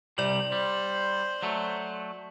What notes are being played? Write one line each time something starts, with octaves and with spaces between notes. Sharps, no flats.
C2 C3 G3 D5 F#7
G3 C5
F#3 A3